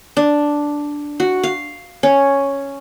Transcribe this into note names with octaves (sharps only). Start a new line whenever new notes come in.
D4
F#4
F5
C#4